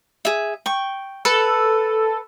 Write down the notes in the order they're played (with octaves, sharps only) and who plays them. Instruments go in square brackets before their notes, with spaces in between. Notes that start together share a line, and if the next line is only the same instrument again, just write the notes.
[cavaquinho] G#4 E5
G5 C#6
[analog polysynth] A4 [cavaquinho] B4